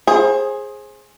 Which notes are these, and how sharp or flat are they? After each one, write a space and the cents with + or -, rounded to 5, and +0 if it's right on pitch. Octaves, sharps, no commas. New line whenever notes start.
G#4 +0 C5 +30